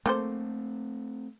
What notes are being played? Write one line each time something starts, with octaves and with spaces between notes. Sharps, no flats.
A3 A#3 C4 A4 C5